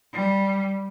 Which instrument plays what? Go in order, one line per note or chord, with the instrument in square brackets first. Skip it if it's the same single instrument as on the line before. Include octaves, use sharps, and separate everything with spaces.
[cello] G3